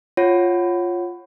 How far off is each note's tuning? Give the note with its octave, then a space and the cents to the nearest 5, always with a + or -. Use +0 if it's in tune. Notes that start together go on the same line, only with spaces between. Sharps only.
F4 +0 C#5 -15 F#5 +5